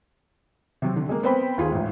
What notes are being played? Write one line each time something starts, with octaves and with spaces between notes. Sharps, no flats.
C3 F#3 C4
D3
G#3 A#3
B3 C4 C5 G5 B5
D#2 F4 G#4
A1 G#2